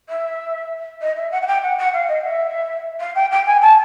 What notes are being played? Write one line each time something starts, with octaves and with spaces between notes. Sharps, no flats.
E5
D#5
E5
F#5
F#5
G5
F#5
F#5
F5
D#5
E5
F5
G5
G5
G#5
A5